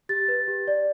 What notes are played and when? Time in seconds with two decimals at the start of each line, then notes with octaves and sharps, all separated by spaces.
0.09 G4 A6
0.28 B4
0.48 G4
0.68 D5